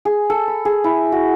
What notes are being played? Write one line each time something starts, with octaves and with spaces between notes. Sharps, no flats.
G#4
A4
B5
G#4
E4
F#4